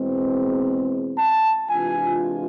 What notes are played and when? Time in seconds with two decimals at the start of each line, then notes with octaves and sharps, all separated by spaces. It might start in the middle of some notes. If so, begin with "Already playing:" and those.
Already playing: E2 B2 G#3 C4
1.18 A5
1.69 C3 E3 G#3 D4 F4 G#5